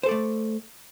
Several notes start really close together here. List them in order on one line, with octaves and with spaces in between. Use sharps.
C5 A4 D5 A3